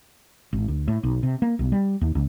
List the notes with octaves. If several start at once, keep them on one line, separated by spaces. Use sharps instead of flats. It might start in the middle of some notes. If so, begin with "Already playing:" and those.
G#1
D2
A2
B1
C3
A#3
B1
G3
D#2
C#2